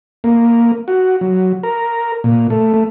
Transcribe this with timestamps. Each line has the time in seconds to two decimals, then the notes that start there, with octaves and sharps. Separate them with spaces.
0.24 A#3
0.88 F#4
1.21 F#3
1.63 A#4
2.24 A#2
2.50 A3
2.74 A3